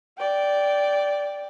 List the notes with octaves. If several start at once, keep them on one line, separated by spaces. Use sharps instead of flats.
D5 G5